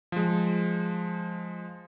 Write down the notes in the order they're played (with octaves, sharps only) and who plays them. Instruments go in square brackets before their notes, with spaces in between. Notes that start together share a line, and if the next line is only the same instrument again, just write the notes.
[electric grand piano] F3 G#3